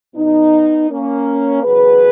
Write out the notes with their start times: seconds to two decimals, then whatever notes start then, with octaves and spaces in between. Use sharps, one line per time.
0.15 B1 B2 F#3 B3 D#4
0.90 A#3 C#4
1.64 E2 C#3 F#3 G#4 B4